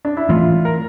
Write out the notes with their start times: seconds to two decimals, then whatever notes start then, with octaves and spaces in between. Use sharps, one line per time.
0.05 D4
0.17 E4
0.29 E3 A3 C4 F4
0.65 A#4